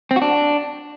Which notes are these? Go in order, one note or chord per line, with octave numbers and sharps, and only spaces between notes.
C4
F#4
D4